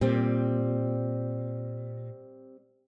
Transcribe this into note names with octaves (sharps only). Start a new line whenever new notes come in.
A#2 G3 C4